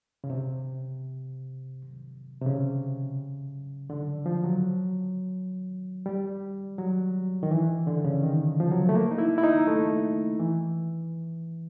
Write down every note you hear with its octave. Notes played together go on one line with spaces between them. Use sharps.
C#3
C3
C3
C#3
D3
F3
F#3
G3
F#3
D#3
E3
D3
C#3
D#3
F3
F#3
A3
A#3
D#4
E4
E4
D#4
A3
E3